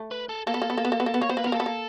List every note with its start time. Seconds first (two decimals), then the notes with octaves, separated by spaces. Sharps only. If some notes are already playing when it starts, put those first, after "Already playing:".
Already playing: A3
0.11 B4
0.29 A4
0.47 A#3 A4
0.54 B3
0.62 A#3
0.70 B3
0.78 A#3
0.85 B3
0.92 A#3
1.00 B3
1.06 A#3
1.14 B3
1.21 A#3 C#5
1.29 B3 C5
1.37 A#3 B4
1.44 B3
1.47 A#4
1.52 A#3
1.55 B3 A4
1.66 A#3